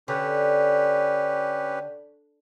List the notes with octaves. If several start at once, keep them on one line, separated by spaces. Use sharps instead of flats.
D3 C#4 G4 B4